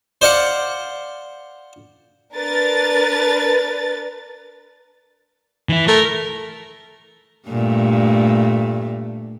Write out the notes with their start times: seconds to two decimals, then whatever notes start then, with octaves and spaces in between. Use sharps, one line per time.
0.21 C5 D5 F5 F#5
2.35 D4 A#4 B4 A6
5.69 E3 E4
5.88 A3 A#4
7.48 G2 A#2 A3